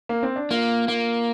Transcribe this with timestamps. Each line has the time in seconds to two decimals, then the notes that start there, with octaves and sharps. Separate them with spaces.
0.09 A#3
0.23 C4
0.36 D4
0.51 A#3 F4
0.88 A#3 F4